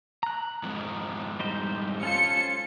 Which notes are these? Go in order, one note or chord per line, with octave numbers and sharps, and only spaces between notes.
A#5 F#6
F2 G#2
G3 D#4 C5
C#4 F4 A4 C5 C#7